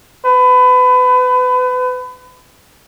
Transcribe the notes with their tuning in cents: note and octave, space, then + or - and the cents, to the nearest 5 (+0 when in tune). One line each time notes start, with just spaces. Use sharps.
B4 +30